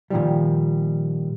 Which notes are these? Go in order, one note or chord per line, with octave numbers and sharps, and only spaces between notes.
A#2 D#3 F3 G3